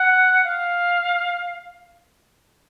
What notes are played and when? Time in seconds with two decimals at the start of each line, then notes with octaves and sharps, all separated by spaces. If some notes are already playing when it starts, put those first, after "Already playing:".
Already playing: F#5
0.44 F5